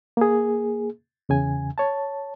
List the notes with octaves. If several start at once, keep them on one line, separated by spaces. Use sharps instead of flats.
A#3 G#4
E2 C#3 G#5
C#5 A5